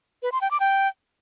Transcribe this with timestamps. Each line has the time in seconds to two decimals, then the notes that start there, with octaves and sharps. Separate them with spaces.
0.23 B4
0.32 C6
0.41 G5
0.51 D6
0.60 G5